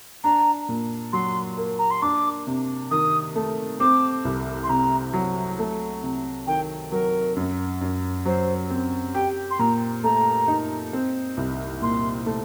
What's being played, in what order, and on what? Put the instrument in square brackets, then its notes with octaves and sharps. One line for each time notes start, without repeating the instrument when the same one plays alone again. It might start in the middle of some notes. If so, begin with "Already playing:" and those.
[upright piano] D4 [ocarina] A#5
[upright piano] A#2
[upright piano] F#3 [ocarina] C6
[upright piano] A#3
[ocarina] A#5
C6
[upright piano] D4 [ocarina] D6
[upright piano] C3
[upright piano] D#3 [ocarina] D#6
[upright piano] A3
[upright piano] C4 [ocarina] D6
[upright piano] C2
[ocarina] C6
[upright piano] C3 [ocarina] A#5
[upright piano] F#3
A3
C3
[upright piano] D#3 [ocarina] G5
[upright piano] F#3 [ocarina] A#4
[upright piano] F#2
F#2
[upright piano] F#3 [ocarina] C5
[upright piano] C4
[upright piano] G4 [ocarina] G5
[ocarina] C6
[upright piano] A#2 [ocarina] A#5
[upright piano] A3 [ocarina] A#5
[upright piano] D#4
C4
C2
[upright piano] A#2 [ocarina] C6
[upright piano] A3